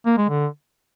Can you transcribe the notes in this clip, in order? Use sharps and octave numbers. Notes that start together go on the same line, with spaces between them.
A#3
G#3
D3